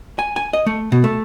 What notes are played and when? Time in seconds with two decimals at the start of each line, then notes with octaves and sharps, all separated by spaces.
0.19 G#5
0.36 G#5
0.53 D#5
0.66 A3
0.92 B2
1.04 A3